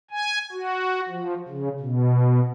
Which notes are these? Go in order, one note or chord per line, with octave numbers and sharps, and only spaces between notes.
G#5
F#4
F3
C#3
B2